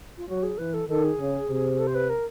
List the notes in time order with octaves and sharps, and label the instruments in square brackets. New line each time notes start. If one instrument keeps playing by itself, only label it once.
[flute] F4
[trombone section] F#3 [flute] F#4
[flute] G#4
[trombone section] E3 [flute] B4
[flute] A4
[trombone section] D#3 [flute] A4
[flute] G#4
[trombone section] C#3
C3
[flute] A4
C5
B4
A#4